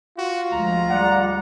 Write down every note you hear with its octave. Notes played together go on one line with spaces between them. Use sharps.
F4 F#4
D2 F3 G#3 A#5
G3 G#3 D5 F#5